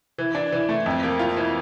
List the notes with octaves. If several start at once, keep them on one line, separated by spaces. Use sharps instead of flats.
E3
D4
E3
A3
F2
A#3
F4
E3